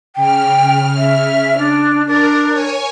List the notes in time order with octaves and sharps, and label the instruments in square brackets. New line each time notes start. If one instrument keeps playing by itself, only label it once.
[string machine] C#3 F6 [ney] G5
[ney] E5
D4
[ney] D4 [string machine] A#4
[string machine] C#5 G#5